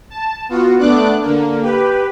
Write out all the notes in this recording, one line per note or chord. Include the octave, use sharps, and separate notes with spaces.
A5
B3 F4 F#4
A3 B3 D4 D6 F#6
D3 A#3
G4 B4